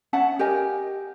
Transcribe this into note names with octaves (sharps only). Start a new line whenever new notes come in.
C#4 E5 F#5 A5
G4 A#4 D#5 G#5